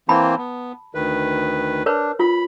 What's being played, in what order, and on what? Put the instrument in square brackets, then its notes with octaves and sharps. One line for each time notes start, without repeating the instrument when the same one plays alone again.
[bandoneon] E3 A#3 C4 [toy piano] A5 B5
[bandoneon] B3
D2 D#3 B4
[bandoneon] D4 [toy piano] A#4 B4 C#5
[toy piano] F4 [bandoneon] B5